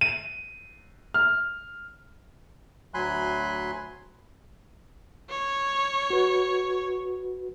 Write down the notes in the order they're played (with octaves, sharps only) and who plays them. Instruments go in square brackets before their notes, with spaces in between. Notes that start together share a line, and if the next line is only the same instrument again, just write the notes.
[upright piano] D#7
F6
[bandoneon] D2 F#3 G#5 B5 C6 F#6
[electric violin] C#5
[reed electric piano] F#4 B4